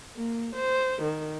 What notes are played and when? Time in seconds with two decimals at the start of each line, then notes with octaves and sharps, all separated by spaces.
0.16 A#3
0.56 C5
1.02 D#3